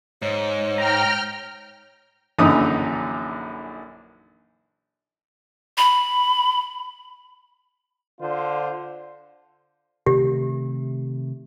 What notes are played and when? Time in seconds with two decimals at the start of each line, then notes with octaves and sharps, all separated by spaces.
0.22 G#2 C#5
0.78 G5 A#5 F6
2.38 A#1 F#2 D3 E3 D#4 D#6
5.78 B5
8.21 D3 D4 F4 C5
10.06 C3 D#3 A3 G4